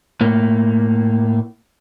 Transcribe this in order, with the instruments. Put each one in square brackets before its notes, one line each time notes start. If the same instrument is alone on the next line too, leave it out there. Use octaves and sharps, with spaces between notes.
[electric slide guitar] A2 A#3